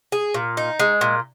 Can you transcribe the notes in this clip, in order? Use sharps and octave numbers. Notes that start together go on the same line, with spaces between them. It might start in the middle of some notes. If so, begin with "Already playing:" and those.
G#4
A#2
D#4
G#3
A#2